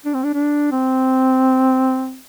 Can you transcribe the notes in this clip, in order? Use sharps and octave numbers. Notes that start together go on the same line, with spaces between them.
D4
C4
D4
D4
C4